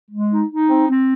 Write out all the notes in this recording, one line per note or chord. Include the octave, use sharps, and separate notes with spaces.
G#3
D#4
D#4
C4
C4